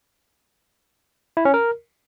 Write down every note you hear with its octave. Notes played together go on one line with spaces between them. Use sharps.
E4
C#4
A#4